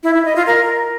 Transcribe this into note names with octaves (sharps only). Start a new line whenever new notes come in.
E4
E4
D#5
F4
A#4